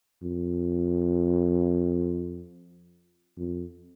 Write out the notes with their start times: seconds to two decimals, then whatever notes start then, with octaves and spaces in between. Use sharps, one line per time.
0.23 F2
3.38 F2